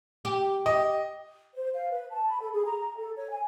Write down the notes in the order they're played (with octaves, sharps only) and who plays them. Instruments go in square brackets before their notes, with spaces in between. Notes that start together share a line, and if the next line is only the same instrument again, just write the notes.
[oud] G4
[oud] G4 [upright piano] D#5
[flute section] C5
F5
B4
A5
B5
A4
G#4
A#5
A#5
A4
C#5
G#5